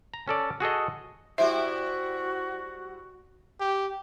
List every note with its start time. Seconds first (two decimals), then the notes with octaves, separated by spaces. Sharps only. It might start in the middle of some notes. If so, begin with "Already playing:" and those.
0.14 A#5
0.28 C#4 A4 D5
0.60 F#4 G#4 A4 D#5
1.38 G3 E4 F#4 C5 E5
3.60 G4